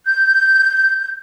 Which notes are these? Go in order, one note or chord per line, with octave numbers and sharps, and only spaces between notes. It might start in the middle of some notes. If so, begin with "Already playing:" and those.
G6